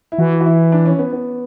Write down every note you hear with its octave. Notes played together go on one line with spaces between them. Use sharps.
E4
E3 F#4
F#4
E4
D4
C#4
B3
B3